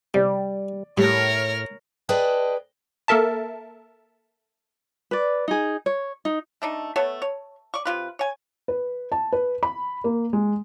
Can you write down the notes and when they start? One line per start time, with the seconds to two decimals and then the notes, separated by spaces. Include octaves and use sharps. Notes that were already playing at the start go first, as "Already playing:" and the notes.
0.14 C3 G3 D5
0.97 A2 G3 A3 A#4 C#5 F6
2.09 G#4 B4 D5 D#5 G5 A5
3.08 A#3 A4 A#4 E5 A5
5.11 B4 D5
5.48 D#4 G#4
5.86 C#5
6.25 D#4
6.62 A3 D4 D#4
6.96 A3 B3 A4 C#5
7.22 C#5
7.74 D5 C#6
7.85 C3 F4 B4
8.19 C#5 G#5
8.68 B4
9.12 A5
9.33 B4
9.63 B5
10.04 A#3
10.33 G#3